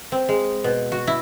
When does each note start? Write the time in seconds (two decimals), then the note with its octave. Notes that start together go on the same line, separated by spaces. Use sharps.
0.12 C4
0.29 G#3
0.64 B2
0.92 F#4
1.07 E4